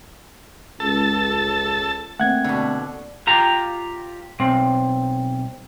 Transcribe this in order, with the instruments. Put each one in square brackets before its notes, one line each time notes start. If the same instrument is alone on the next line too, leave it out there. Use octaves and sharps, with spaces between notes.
[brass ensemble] C#2 [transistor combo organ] A4 A5
[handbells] A3 A#3 C4 [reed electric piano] F#5 G#6
[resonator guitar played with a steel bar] B2 D3
[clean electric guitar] F4 G4 A#5
B1 C4